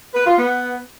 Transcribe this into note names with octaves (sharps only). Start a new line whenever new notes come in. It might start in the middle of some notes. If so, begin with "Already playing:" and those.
B4
F4
B3